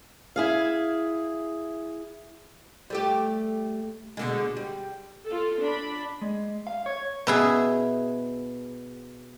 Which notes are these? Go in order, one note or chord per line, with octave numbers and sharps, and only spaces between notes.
E4 G#4 F5
G3 A3 G4
B2 D3 G#3
G3
F4 A4
D4 B5
G#3
F5
C#5
B2 E4 G#4